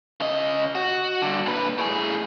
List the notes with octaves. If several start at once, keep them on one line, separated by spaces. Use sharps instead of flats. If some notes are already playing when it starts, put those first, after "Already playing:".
C#3 D#5
F#4
G2 D3
A#2 B4
A2 G#4